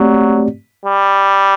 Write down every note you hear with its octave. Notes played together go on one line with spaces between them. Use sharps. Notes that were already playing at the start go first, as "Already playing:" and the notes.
Already playing: F#3 A3 C4 G4 D5
G3